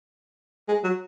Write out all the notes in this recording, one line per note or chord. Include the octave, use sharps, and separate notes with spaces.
G#3
F#3